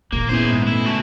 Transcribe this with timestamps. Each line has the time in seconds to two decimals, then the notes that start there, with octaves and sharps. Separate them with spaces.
0.12 A#2 D#3 A#3
0.29 B3 C#4 E4 G#4 C5
0.51 G#2
0.67 A3 E4
0.86 F#4 A5